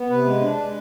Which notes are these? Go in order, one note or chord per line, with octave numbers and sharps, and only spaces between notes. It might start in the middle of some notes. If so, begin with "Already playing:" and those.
Already playing: B3
C3 B4
G#3
D4
G#3